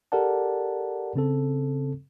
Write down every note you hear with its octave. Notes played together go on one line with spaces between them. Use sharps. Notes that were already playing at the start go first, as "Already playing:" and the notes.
G4 A4 A#4 D5 F#5 A5
C#3 C4 A4